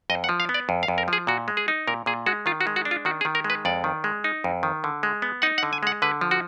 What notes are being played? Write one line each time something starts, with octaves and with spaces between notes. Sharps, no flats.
F2 D#5
F#5
F3
F5
B3
D5
F2
F5
F2
A#4
F3 G#4
A#2 F#4
G#3
G#4
D#4
A#2 A#4
A#2 G#4
G#3 F#4
D#3 F4
F#4
G#3
F#4
D4
F4
D#3 F#4
G#4
D#3
A#4
G#3
B4
F2 D5
D#3
G#3
D#4
F2
D#3
D3
G#3
B3
D#4 F#5
F#5
D3
G#5
G#3 F#5
D3 B4
F3
F#4